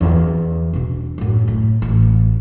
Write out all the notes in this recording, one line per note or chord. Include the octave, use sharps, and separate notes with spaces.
E2
B2 D4
F#2 A2
A2
A1